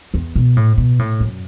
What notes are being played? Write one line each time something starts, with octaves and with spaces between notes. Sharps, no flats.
E2
B2
A2
B2
A2
F#2